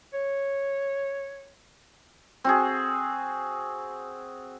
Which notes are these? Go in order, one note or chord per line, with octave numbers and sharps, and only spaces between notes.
C#5
C4 F#4 G#4